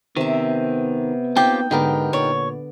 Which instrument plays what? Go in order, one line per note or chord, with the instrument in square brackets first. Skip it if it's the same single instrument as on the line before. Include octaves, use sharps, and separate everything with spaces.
[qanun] C3 E5 [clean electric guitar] D#3 [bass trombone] B3
[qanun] A#3 D#4 [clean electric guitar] C4 F4 G4 [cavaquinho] G5
[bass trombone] G#2 [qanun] D3 B3 D5 [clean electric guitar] D#4 G4 A#4
[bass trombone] A#2 [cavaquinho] C#5 [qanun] D5